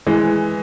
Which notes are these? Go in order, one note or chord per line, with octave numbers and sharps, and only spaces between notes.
E3 G#3